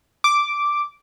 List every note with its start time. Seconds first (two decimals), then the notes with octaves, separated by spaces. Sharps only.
0.24 D6